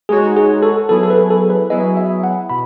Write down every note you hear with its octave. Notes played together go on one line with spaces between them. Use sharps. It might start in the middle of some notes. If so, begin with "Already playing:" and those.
G#3 D#4 F#4 G#4 C#5
G#4
A4
F#3 B3 E4 G#4 A4
A4
B4
A4
B4
F#3 B3 E4 G#4 D#5
E5
F#5
B2 B5